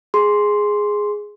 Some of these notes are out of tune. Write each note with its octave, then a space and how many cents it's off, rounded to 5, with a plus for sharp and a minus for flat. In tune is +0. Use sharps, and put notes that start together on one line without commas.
G#4 +0 C6 +0